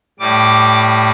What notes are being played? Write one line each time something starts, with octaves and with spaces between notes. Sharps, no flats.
A2 G3 D6